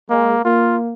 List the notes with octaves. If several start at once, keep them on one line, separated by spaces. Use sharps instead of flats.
G#3 A#3
A#3 F4